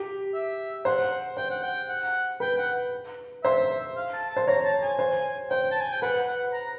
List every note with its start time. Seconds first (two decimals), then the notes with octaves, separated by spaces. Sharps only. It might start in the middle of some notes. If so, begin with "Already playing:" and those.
Already playing: G4
0.34 E5
0.85 C5 F#5
1.37 C5 G5
1.50 F#5
1.63 G5
1.88 F#5
2.40 B4 G5
2.58 F#5
3.43 C5 E5
3.96 F5
4.13 A5
4.30 A5
4.37 C5
4.47 C#5 A#5
4.64 A5
4.82 G#5
4.99 C5
5.50 C5 G5
5.71 A5
5.81 G#5
5.92 G5
6.02 B4 F#5
6.28 F#5
6.53 A#5